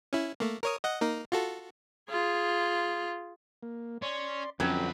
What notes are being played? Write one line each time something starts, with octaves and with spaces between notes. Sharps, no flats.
C#4 E4
A3 A#3
A#4 C#5 D#6
D#5 F#5
A#3 D#4 A#4
F4 F#4 A4
F4 G#4
A#3
C#4 D5 C6
F2 D3 F#3 C#4 B4 G5